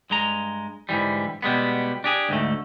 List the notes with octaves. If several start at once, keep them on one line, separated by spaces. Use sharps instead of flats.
G2 G#3 A#5
G#2 D3 E3 G3
B2 G3 G#3 B3
D4 G4 G#4
D2 G#2 A3